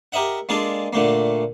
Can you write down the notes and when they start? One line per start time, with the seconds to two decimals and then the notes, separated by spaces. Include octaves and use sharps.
0.12 G4 A#4 D#5 E5 F#5
0.49 G#3 A#3 D4 F4 G#4 A4
0.93 A#2 D3 A3 A#3